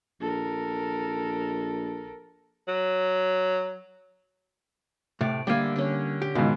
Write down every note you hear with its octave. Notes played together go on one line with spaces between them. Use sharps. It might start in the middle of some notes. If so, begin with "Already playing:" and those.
A#1 A4 A#4
F#3
A2 C3 D5
D3 G3 A#3 E5 G#5
D3 C#4
G4
C#2 G#2 B2 D#3